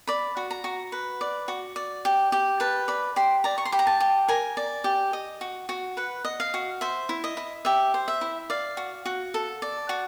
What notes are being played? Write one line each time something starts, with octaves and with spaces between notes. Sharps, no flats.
D5 B5
F#4
A#5
F#4
B4
D5
F#4
D5
G4
G4
B4 A5
D5 B5
G4 C6
D5 A#5
C#6
C6
G4 B5
A#5
A5
G4
A#4 G#5
D5
G4
D#5
F#4
F#4
B4 F#5
D#5
F5
F#4
C5 E5
E4
D#5
E4
G4 E5
C5
E5
E4
D5 F5
F#4
F#4
A4
D5
F#4